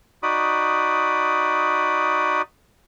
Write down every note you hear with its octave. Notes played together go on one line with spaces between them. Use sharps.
D#4 F#4 D5 B5 D#6